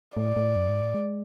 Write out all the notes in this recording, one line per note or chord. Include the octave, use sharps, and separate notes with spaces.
A2 D5
A2
F#2
G#2
A2
G#3